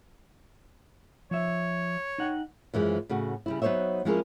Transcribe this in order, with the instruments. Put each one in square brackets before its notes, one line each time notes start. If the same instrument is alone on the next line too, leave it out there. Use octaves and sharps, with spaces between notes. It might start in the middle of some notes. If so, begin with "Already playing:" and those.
[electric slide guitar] F3 E5 [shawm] C#5
[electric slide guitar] D#4 F#5 G5
[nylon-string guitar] F#2 E3 F3 G#3
A2 C#3 F#4
C#3 G3 E4
F#3 B3 D#4 C5 C#5 E5
F3 G#3 C#4 E4 G#4 A#4